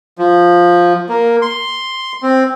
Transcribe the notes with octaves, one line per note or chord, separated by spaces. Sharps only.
F3
A#3
C6
C4